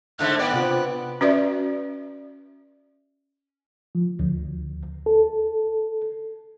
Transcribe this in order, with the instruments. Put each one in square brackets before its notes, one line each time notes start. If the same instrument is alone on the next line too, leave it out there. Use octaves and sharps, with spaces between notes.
[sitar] G#2 D3 A3 [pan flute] F#6
[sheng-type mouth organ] B3 F#6 [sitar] D5 [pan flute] G5
[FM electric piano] C3 F4 C5
[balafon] C#4 F#4 B4 D5 E5
[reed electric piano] F3
D2
A4